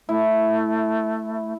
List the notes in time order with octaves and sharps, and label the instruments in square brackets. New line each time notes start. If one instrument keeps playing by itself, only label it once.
[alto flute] A3 [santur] E4